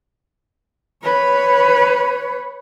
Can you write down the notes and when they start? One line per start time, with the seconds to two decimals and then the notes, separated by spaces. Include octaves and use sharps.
1.03 B4 C#5